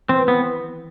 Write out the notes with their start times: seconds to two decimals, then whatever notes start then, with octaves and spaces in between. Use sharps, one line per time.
0.09 E3 C4
0.28 B3